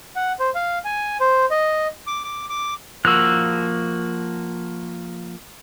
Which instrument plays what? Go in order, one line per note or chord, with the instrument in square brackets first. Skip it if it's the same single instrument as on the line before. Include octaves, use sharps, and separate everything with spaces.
[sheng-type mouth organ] F#5
C5
F5
G#5
C5
D#5
D6
D6
D6
[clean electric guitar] F3 A#3 F#4 [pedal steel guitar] E6 F#6